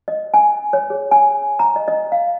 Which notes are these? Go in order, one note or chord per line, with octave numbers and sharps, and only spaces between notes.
D#5
G#5
C#5
G#4
G#5
A#5
D#5
D#5
F5